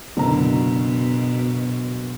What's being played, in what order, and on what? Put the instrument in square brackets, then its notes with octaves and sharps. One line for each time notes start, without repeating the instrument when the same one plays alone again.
[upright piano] F#1 D3 A#5 [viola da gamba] B2